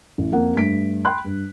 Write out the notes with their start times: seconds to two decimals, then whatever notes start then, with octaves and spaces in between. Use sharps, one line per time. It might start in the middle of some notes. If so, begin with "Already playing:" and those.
0.18 A1
0.32 F2 A#3 F#5
0.55 G2 A3 B6 D7
1.05 G5 B5 C6 F#6
1.25 G2